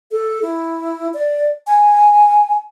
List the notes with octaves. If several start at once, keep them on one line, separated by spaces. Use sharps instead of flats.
A4
E4
D5
G#5